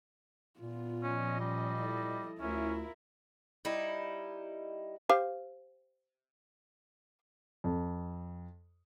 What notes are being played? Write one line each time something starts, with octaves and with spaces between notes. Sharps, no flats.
A#2 B3 F4
F3 C#4 D#5
G3 C#4
E4 A4
D2 C#4 E4 F4 A#4
G3 D#4 E4
G4 C5 F5
F2